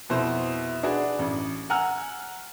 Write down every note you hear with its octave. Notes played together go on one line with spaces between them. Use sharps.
F2 B2 E4 C5
D4 F#4 G#4 B4
A1
F#5 G#5 A#5 E6 F6